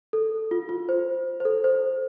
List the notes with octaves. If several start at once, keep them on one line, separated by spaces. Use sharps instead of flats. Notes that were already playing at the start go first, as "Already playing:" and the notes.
A4
F4
F4
C5
C5
A4
C5